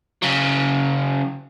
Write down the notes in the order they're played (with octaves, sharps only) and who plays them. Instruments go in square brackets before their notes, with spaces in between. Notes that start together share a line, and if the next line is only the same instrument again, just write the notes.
[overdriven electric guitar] C#3 F#3